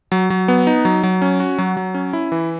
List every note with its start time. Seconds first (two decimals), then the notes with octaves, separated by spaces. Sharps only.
0.12 F#3
0.30 F#3
0.48 B3
0.67 D#4
0.85 F#3
1.03 F#3
1.22 C#4
1.40 F#4
1.58 F#3
1.77 F#3
1.94 C#4
2.13 E4
2.32 E3